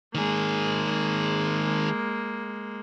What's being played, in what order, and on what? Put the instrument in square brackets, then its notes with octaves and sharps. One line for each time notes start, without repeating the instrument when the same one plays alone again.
[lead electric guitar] D#3 G#4 [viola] G#3 A#3